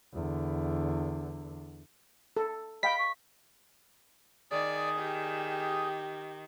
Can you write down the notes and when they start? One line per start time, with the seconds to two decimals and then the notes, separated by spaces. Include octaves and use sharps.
0.14 E2 D3
2.37 A4
2.83 D#5 F5 G5 B5 B6
2.99 C#6
4.51 D#3 G#4 D5 D#6
4.99 G4